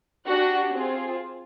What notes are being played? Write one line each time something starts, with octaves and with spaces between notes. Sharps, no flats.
D4 F#4 G4 F#5
C4 F4 G#4